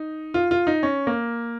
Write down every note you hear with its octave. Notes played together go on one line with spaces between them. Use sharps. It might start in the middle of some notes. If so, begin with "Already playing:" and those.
Already playing: D#4
F4
F4
D#4
C#4
A#3